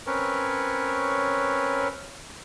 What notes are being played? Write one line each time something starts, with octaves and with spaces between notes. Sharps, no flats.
C4 C#4 A#4 B4 C#5